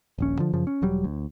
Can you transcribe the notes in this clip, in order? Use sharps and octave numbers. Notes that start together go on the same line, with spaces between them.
D#1 A#1 C#4
D3 F3
F#2 C#3 F3
C#4
E1 F#3 G3
D2